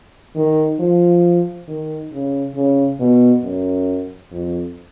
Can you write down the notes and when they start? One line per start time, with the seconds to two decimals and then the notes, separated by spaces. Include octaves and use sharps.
0.36 D#3
0.80 F3
1.68 D#3
2.12 C#3
2.55 C#3
3.00 B2
3.43 F#2
4.32 F2